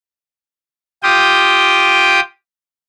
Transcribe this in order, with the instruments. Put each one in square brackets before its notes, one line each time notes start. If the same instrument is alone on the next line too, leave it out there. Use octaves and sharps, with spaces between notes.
[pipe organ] F4 G4 G5 D#6